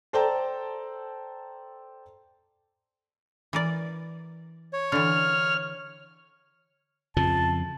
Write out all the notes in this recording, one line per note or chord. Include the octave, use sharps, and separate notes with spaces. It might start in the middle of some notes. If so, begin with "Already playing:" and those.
A4 C5 D5 G5 A5 A#5
E3 A#4 D5
C#5
D3 E3 F6
F2 C#3 F3 A5